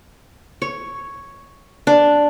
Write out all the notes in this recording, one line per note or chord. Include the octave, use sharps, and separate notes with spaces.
C#5
D4